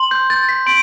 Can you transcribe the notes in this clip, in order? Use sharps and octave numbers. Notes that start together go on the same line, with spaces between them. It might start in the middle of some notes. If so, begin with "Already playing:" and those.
Already playing: C6
G6
G6 A6
B6
C6 D7